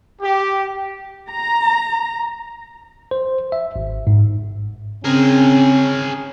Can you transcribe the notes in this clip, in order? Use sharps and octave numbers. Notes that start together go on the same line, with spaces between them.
G4
A#5
C5
E5
G#1
G#2
C#3 C4 C#4 G#4 A#4